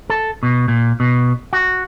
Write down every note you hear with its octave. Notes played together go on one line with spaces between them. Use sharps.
A4
B2
A#2
B2
F#4